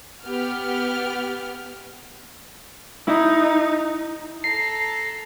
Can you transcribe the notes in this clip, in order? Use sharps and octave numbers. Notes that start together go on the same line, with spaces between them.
B3 G4 F6
D#4 E4
A4 A#5 C7